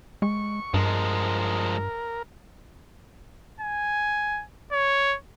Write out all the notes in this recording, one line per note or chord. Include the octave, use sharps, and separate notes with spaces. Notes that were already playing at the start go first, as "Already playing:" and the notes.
G#3 C#6
G2 F3 G#3 A#4
G#5
C#5